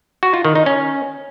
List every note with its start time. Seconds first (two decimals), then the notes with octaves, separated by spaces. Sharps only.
0.23 F#4
0.34 F4
0.45 D#3
0.55 D#4
0.66 C#4